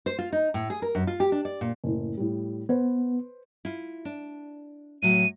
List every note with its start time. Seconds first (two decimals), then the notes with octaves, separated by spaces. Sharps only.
0.06 C5
0.18 F4
0.32 D#4
0.54 A2
0.70 G#4
0.82 A#4
0.95 F#2
1.07 F4
1.20 G4
1.32 D4
1.45 D5
1.61 A#2
1.84 F#1 A2
2.17 A2 G3
2.69 B3 B4 C5
3.65 E4 F4
4.05 D4
5.02 A2 F#3 D#7